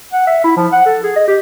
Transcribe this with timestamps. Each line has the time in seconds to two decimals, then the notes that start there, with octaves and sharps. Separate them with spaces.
0.13 F#5
0.27 E5
0.44 E4
0.57 F3
0.72 F#5
0.86 A4
1.03 G#4
1.16 D#5
1.27 G4